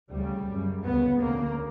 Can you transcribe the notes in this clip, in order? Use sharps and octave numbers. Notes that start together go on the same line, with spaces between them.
D2 C#3 G3
F#2 C#3
D2 C#3 B3
D2 C#3 A#3